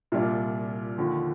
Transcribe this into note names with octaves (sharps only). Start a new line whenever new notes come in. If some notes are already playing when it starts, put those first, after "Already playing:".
C2 A#2 G3 D4 F4
D#2 D3 F3